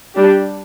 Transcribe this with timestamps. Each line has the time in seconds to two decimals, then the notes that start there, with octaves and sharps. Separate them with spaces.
0.15 G3 D4 G4